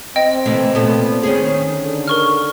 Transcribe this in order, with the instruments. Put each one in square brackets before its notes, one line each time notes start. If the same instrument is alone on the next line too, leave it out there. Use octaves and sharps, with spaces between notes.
[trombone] C4 [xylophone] D#5 G5
[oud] C3 E3 A3
A#2 B3 A4
D#3 C#4 G#4
[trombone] D3
[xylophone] A#4 C#6 F6